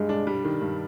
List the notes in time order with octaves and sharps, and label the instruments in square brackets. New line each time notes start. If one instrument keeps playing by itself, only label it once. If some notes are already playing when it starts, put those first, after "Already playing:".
Already playing: [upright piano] G2 [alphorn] G#3
[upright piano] D4
G3
D#3
G2